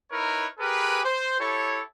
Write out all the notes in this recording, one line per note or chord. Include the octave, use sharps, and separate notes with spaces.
D#4 E4 A#4 B4 C#5
G4 G#4 A#4 B4
C5
E4 G4 A4 C#5